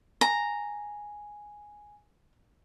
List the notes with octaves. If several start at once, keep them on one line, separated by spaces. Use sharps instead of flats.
G#5 A#5